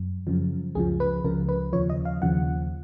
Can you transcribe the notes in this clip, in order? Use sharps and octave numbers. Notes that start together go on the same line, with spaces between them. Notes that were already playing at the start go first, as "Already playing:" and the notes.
Already playing: F#2
F#2 C#3 F3
C#2 C#3 F3 G#4
B4
C#2 C#3 F3 A#4
B4
D#2 C#3 F3 C#5
D#5
F5
D#2 C#3 F3 F#5